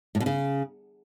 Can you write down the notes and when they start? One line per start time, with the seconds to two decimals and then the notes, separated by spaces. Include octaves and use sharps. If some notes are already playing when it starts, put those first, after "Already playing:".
0.15 A2
0.20 B2
0.26 C#3